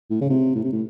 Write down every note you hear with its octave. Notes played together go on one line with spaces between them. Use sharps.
A2
C#3
C3
A2
C3
A2